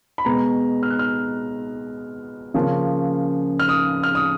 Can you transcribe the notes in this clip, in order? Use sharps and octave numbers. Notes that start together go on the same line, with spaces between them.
B5
B2 G#3 B3 A#5
F6
F#6
F6
C#3 F3 A#3 C#4
F6
D#6
F6
D#6